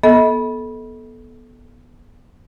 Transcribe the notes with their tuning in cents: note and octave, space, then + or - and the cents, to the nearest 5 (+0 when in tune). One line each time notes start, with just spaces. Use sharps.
B3 -20 A4 -15 D#5 +40